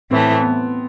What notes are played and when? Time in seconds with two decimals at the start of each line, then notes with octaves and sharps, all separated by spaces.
0.11 A2 E3 A3 C4
0.41 B3